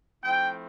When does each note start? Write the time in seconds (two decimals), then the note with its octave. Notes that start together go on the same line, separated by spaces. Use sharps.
0.22 F3 A3 C4 E4 G5